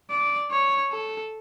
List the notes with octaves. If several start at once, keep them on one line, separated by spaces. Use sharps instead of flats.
D5
C#5
A4